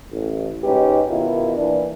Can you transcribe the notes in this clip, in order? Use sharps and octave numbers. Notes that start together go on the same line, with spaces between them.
A1
G#2 C#4 D#4 G4 B4
B2 D#3 E4 F4 A#4
A#2 E3 D4